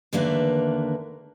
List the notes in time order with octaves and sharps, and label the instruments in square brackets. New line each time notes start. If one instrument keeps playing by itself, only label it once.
[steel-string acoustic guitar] E2 D3 D#3 A#3 B4 E5